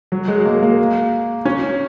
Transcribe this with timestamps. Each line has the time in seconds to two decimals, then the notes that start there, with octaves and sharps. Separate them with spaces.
0.12 F#3
0.28 G#3
0.45 A#3
0.63 A#3
1.45 C#4